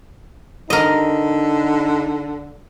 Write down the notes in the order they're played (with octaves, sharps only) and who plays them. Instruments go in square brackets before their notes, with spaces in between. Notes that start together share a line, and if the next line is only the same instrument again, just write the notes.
[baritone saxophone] D3 [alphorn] D#4 [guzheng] A#4 D#5